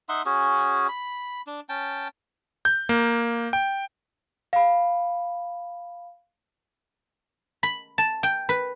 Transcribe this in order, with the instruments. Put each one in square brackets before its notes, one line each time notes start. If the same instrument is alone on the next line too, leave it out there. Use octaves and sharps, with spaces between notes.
[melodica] D#4 E5 F#5 C6
C#4 F#4 G#4
B5
D4
C#4 G5 A5
[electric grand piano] G6
A#3
G5
[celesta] F5 B5
[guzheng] B5
A5
G5
B4